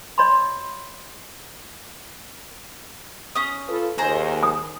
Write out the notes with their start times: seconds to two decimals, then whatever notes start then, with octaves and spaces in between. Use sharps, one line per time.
0.18 C#5 D#5 B5 C6
3.35 C#4 D#6
3.68 F4 A4 B4
3.98 D#2 G#4 C5 A#5
4.43 D#6